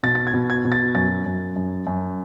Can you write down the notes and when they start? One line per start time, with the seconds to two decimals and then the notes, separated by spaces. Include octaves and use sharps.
0.03 B2 A6
0.15 A6
0.27 G#6
0.34 B2
0.50 G#6
0.65 B2
0.72 A6
0.95 F#2 A6
1.26 F#2
1.56 F#2
1.87 F#2